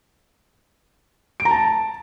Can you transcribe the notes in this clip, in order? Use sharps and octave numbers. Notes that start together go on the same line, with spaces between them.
D7
A#5
A5